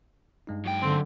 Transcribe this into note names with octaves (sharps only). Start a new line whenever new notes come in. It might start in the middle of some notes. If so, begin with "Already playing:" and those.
G2 G#3 D#4
F#2 G5
D3 C4